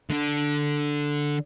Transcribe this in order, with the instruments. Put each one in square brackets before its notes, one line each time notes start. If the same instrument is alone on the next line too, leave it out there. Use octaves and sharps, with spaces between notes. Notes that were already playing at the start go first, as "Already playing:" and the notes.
[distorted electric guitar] D3 D4